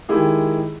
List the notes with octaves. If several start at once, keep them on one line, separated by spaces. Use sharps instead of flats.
D#3 G#3 E4 G4 G#4